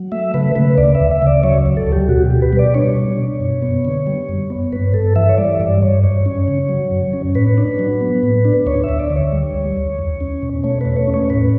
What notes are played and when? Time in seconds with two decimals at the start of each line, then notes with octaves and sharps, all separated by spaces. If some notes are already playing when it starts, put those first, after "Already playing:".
Already playing: F#3
0.12 A3 E5
0.34 C#3 B4
0.55 C#3 B4
0.78 D2 D5
0.95 E5
1.00 D2
1.11 E5
1.22 C#3 D5
1.43 F#3 C#5
1.66 D2
1.77 A4
1.87 D2
1.93 G4
2.09 B2 F#4
2.25 G4
2.31 B2
2.42 B4
2.53 G3
2.59 D5
2.74 D4 C#5
2.96 B2
3.19 B2
3.40 F#2
3.62 B3
3.85 D3
4.07 G3
4.29 F#2
4.50 B3
4.72 G2 B4
4.94 G2 A4
5.16 E3 E5
5.29 C#5
5.38 G3 D5
5.59 G2 D5
5.82 G2 C#5
6.04 F#2 C#5
6.26 C#4
6.48 C#3
6.69 F#3
6.91 F#2
7.13 C#4
7.35 A2 B4
7.58 D4
7.79 F#3
8.01 B3
8.23 A2
8.45 D4
8.66 D2 C#5
8.84 D2 E5
8.99 D5
9.10 D3
9.16 C#5
9.32 G3
9.54 D2
9.77 D2
9.99 E2
10.21 C#4
10.42 B2
10.64 A3 C#5
10.81 E2 B4
10.97 C#5
11.07 C#4
11.14 C#5
11.30 A2 B4